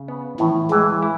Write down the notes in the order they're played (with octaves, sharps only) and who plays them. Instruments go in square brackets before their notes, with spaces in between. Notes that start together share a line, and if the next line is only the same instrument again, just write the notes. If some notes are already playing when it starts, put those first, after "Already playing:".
Already playing: [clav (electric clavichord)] C#3
B3
[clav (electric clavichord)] A2 [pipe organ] E3
[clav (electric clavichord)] E3 [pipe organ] G#3
[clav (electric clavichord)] E4